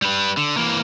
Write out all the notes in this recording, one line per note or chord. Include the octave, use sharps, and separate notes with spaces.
G3 B4
D3
E3 A#3